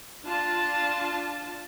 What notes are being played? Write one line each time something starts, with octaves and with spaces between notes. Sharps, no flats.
D4 F4 A5